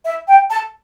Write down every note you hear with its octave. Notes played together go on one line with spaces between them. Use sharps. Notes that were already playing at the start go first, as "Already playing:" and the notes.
E5
G5
A5